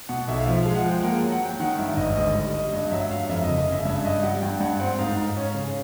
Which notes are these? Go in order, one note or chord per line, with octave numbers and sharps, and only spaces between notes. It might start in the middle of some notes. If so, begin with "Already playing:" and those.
B2 F#5
B1 E5
F5
F3 E5
F5
G#3
F#5
F3 G5
A#3 F#5
F#3
F#5
F#3 G5
D#3 F#5
G2 E5
G#1 D#5
D2 D#5
G3 D#5
G3 D#5
G2 D#5
F#3 E5
G2 F5
F2 E5
F#1 D#5
D#5
C#3 E5
G2 E5
E5
G2 D#5
G3 F#5
G2 G5
G2 F#5
C4 F#5
G#2 F5
G#2
C#4
C#3